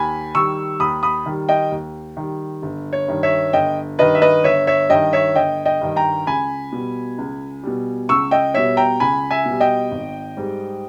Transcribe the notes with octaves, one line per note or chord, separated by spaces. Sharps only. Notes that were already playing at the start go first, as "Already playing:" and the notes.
Already playing: D#2 G#5 B5
D#3 G3 C#6 E6
D#2 B5 D#6
B5 D#6
D#3 G3
D#5 G5
D#2
D#3 G3
G1
C#5
G2 D#3
C#5 E5
G1 D#5 G5
G2 D#3 B4 D#5
E5
B4 D#5
G1 C#5 E5
C#5 E5
G2 D#3 D#5 G5
C#5 E5
G1 D#5 G5
D#5 G5
G2 D#3
G5 A#5
C#2 G#5 B5
B2 G3
C#2
B2 G3
C#2 C#6 E6
D#5 G5
B2 G3 C#5 E5
G5 A#5
C#2 G#5 B5
E5 G#5
B2 G3
D#5 G5
G#1
G#2 G3